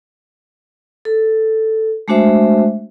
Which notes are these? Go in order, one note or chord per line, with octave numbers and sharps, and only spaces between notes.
A4
G#3 A3 D4 F#4 C5 E5